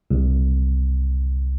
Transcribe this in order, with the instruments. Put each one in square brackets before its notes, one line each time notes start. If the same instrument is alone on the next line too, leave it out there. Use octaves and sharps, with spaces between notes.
[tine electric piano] C2